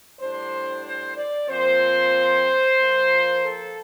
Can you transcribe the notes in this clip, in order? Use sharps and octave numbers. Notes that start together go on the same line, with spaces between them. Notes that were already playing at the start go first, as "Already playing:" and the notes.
A2 G3 D4 C5
C5
D5
A#2 F3 C4 C5
A#2 F3 A#3
A4